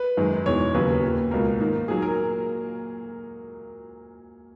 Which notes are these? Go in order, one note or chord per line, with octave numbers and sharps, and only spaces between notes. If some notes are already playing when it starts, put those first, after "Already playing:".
Already playing: B4
F#2 D#3 G#3
E2 B2 G#3 C#5
D#2 C#3 F#3 B4
A#2 A#3
C#2 B2 A#3 A#4
G#2 D#3 A#3
A#2 F#3 A#3 G#4
A#4